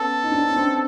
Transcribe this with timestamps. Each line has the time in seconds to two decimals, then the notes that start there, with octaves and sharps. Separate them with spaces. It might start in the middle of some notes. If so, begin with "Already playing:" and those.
Already playing: B3 C#4 A4
0.24 D#4
0.32 C4 D4
0.50 C#4
0.56 C4 D4